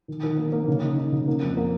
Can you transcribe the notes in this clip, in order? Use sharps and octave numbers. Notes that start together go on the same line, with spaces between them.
D#3
D#3
A#3
A#3
C#3
D#4
D#4
C#3
A#3
F2
A#3